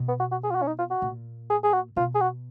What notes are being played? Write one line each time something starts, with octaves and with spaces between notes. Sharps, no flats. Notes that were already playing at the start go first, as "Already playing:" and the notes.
Already playing: B2
B3
F#4
F#4
G#4
F4
F#4
C#4
D#4
F4
F#4
A#2
G#4
G#4
F#4
B2 F4
G#4
F#4